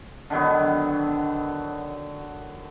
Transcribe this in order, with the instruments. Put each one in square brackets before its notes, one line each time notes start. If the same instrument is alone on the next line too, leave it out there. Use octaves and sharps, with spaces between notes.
[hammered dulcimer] D3 D#3 F#3 B3